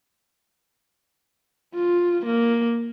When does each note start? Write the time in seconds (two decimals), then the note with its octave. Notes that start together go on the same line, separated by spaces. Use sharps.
1.75 F4
2.26 A#3